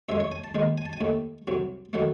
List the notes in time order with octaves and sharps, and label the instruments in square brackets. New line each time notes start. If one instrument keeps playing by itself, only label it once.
[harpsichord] F#2 C#3 G#3 E5
C#5
G#5
A5
D#2 D#3 G#3
G#5
A5
G#5
D#2 D#3 A3
C2 C3 F#3
D#3 F#3 A3 F#5